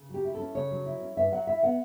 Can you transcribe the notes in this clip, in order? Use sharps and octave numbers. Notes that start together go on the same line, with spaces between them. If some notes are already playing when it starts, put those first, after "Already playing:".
Already playing: C#3
F#3 G4
E4
A4
C#4
C#3 C#5
F#3
E4
C#4
G2 E5
F#3 F#5
E4 E5
B3 F#5